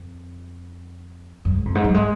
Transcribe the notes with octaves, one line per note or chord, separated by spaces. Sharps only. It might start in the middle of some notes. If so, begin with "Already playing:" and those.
Already playing: F2
F#2
G#2
F2
G#2
F#3
G#3